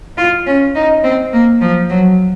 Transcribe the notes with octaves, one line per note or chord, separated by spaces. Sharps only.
F4
C#4
D#4
C4
A#3
F3
F#3